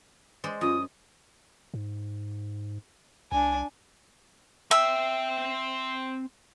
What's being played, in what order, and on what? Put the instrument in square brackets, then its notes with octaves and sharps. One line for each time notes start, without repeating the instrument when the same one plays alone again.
[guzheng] G#3 C5 D5
[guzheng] F#2 [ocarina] F4 [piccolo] D#6
[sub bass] G#2
[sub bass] C2 [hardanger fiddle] D4 G#5
[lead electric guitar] C4 G5 [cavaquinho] E5